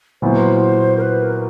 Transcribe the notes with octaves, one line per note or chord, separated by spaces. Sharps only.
A#2 F#3 B3 E4 C5
A#4
B4
A#4